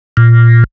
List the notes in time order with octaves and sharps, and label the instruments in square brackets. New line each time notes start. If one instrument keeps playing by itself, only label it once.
[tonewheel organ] A#2